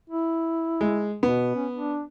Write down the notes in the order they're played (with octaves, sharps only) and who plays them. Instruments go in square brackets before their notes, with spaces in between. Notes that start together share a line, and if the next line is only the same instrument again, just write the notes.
[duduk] E4
[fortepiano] G#3
[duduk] B2 [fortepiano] B3
[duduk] C#4
D4